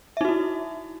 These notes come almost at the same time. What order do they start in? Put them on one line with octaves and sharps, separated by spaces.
E5 D#4 F#4 E4